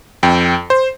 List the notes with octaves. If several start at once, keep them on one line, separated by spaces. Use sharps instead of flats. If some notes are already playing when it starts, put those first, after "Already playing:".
F2 G5
C5